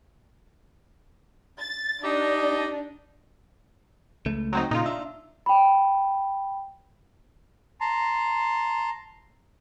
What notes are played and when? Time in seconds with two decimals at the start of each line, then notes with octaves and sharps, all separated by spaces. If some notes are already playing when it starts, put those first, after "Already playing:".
1.59 A6
2.04 D4 D#4 G4 D#5
4.26 C#2 A3
4.53 F#3 C4 D#4
4.71 A#2 C#3 D#4 F4
4.86 D4 E5
5.46 G5 B5
7.81 A5 A#5 C6